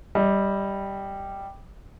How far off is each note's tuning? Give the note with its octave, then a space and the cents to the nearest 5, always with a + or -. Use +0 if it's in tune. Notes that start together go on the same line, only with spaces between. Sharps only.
G3 +0 D#5 +25